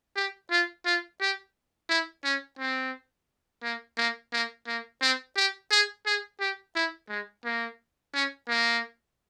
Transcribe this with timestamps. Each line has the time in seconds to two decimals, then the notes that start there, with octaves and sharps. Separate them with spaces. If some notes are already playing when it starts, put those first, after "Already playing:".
0.16 G4
0.51 F4
0.85 F4
1.21 G4
1.89 E4
2.24 C#4
2.59 C4
3.63 A#3
3.97 A#3
4.33 A#3
4.67 A#3
5.01 C4
5.36 G4
5.71 G#4
6.06 G#4
6.40 G4
6.75 E4
7.09 G#3
7.45 A#3
8.14 C#4
8.48 A#3